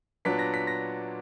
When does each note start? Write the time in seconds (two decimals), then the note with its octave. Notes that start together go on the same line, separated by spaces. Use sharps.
0.25 A#2 F#3 B3 D4 B6
0.39 A#6
0.54 B6
0.67 A#6